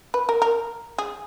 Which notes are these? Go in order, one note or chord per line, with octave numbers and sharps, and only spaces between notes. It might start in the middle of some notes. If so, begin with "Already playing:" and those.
B4
A#4
A#4
G#4